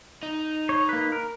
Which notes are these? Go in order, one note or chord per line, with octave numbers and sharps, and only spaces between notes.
D#4
C#5
A#3 B4
A#4